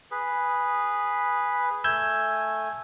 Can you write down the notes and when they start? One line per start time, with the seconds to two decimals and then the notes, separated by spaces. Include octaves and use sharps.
0.11 G#4 B4
1.84 A3 G#5 E6 G6 G#6